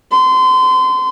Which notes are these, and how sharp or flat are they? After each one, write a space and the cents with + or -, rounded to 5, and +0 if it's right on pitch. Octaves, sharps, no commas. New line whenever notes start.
C6 -30